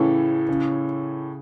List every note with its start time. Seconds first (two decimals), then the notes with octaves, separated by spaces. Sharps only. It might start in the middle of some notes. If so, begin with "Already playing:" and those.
Already playing: A2 C#3 E3 C#4 A4 C#5
0.49 C#3